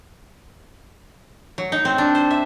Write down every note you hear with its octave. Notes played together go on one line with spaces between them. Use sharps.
F#3
D#4
C4
D4
C5
E5